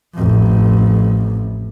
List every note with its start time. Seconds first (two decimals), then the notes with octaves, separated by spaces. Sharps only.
0.15 A1 F2